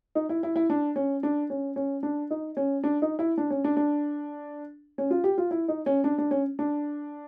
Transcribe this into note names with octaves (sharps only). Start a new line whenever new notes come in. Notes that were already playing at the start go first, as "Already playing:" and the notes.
D#4
E4
E4
E4
D4
C#4
D4
C#4
C#4
D4
D#4
C#4
D4
D#4
E4
D4
C#4
D4
D4
C#4
F4
G4
F4
E4
D#4
C#4
D4
D4
C#4
D4